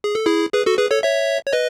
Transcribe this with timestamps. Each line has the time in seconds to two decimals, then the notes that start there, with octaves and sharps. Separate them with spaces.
0.04 G#4
0.15 A4
0.26 E4 G#4
0.54 G#4 B4
0.66 F#4 A4
0.78 G#4 B4
0.91 A4 C#5
1.03 C#5 E5
1.46 C#5
1.53 B4 D#5